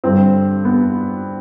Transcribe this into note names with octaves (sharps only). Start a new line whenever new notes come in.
G2 D3 C4
B3